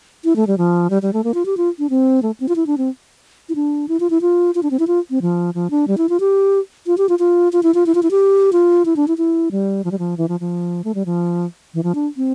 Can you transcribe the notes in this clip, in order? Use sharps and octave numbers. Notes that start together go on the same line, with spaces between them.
E4
A3
G3
F3
G3
G3
A3
A#3
F4
G4
F4
D4
C4
A3
C4
F4
E4
D4
C4
E4
D4
E4
F4
E4
F4
F4
D4
C4
E4
F4
C4
F3
F3
D4
G3
E4
F4
G4
F4
G4
F4
F4
F4
E4
F4
E4
F4
E4
G4
F4
E4
D4
E4
E4
G3
F3
G3
F3
E3
F3
F3
A3
G3
F3
E3
F3
D4
C4